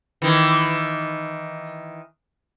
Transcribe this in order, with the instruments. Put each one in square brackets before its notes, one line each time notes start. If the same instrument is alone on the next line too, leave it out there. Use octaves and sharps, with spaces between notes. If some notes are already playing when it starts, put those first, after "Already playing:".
[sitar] D#3 E3